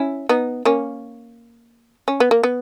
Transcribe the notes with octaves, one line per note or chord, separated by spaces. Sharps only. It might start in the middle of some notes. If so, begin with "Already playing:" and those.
Already playing: C#4 E4
B3 D#4
A#3 C#4
C#4
B3
A#3
B3